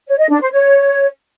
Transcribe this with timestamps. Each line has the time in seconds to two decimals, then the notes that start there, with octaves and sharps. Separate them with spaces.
0.08 C#5
0.19 D#5
0.30 D4
0.41 C5
0.52 C#5